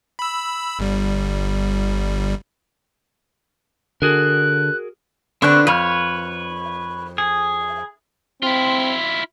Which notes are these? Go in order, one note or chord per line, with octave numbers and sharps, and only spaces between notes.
B5 E6
G1 G3
D3 F#4 G#4 A#4 F#6
D3 B3 C4 D4 C#6 F#6
F2 B4 C#5 F6
G#4
C4 E4 F4